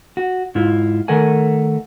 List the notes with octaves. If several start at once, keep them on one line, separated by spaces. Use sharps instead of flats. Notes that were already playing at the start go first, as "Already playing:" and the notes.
F#4
G#2 E4 F4
D#3 A3 A#4 F#5 G#5